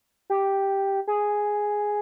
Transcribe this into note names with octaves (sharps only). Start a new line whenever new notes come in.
G4
G#4